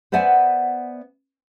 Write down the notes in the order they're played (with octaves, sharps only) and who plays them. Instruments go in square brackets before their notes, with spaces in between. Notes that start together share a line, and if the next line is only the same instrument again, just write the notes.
[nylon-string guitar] B3 C5 D5 E5 F#5 G#5